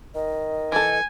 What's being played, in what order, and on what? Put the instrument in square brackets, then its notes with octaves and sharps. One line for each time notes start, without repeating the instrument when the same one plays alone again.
[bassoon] D#3 [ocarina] D#5
[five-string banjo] E3 A4 [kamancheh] G#5